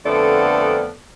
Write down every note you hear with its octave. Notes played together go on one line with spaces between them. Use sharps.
F2 D3 A3 B3 A4 D5